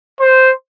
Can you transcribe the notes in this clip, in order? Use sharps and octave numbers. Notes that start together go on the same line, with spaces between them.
C5